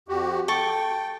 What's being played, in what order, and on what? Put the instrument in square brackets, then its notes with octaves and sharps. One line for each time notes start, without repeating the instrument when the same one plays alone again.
[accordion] F2 F#4 G4
[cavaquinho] A4 C#6 [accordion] G5